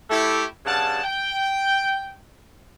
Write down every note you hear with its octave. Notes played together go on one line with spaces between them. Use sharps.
A3 E4 G4
G2 C#3 F#5 A5
G5